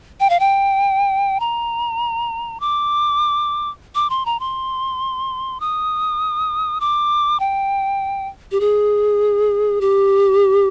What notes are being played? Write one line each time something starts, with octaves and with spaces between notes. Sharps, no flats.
G5
F5
G5
A#5
D6
D6
C6
A#5
C6
D#6
D6
G5
G4
G#4
G4